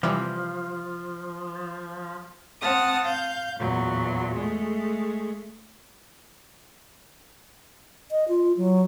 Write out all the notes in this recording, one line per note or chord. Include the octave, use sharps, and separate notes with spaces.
C3 E3 F3 G3
C4 F#5 A5 D#6 F6
F5 G6
E2 A#2 F#3
G#3 A3
D#5
F4
F#3